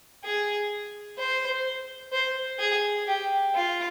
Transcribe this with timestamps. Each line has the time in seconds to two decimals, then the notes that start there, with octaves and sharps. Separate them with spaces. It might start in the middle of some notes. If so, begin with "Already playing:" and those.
0.25 G#4
1.18 C5
2.13 C5
2.59 G#4
3.07 G4
3.55 F4